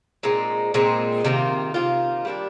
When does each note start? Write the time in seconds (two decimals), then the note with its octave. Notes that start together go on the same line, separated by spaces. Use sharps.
0.23 A#2 G#3 C4 D#4
0.74 A#2 G#3 C4 D#4
1.25 C3 D#3 A#3 F4
1.74 C3 D#3 A#3 F4
2.25 G3 A#3 D4 G4